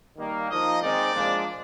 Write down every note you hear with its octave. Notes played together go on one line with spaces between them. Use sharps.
D#3 G3 A#3
F3 A#3 D#4 D#5
D#3 G#3 C4 D#4 D5
A#2 F3 G#3 D4